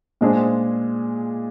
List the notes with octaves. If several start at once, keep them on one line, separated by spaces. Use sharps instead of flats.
A#2 G#3 D4 G#4 C5